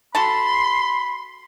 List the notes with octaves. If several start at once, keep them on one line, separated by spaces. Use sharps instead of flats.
F#4 A4 A5 B5 C6